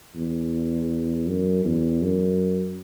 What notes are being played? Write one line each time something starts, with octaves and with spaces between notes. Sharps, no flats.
E2
F#2
E2
F#2